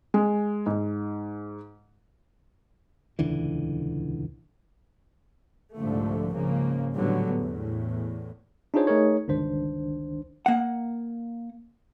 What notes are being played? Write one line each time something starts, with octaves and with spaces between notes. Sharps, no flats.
G#3
G#2
D#1 C#2 D3 E3
C2 G#2 D3 F3 A3
G#2 C#3 F3 A#3
A2 D3 F#3 G3 B3
E2 A2
D4 D#4 F4 G#4 C5 C#5
A3 D#4 G#4 A#4 C#5
G1 C#2 D#3 D4 C5
A#3 F#5